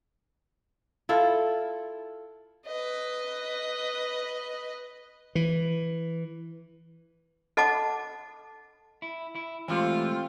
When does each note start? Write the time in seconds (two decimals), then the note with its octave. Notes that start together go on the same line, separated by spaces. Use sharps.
1.09 E4 F4 A4
2.67 B4 D#5
5.35 E3
7.57 A4 D#5 F#5 A5 D6
9.02 E4
9.35 E4
9.68 E3 G#3 A3 C4 F4 G4 C5